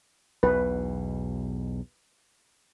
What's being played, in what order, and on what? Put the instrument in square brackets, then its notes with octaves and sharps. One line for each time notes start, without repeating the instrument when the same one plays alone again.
[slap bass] B1 E2 B2 [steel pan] B4